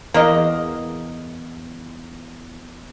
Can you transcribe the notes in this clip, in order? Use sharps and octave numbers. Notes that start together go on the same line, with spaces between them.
E2 A#3 D#5